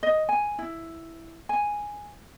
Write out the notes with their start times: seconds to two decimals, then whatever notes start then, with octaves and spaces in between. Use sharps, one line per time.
0.03 D#5
0.29 G#5
0.59 E4
1.49 G#5